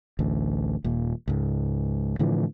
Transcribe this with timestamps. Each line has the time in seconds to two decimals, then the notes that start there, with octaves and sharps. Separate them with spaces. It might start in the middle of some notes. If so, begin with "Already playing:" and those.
0.19 A1 D2
0.84 D#1 A#2
1.28 C#2 G#2
2.19 A2 D3 E3 F3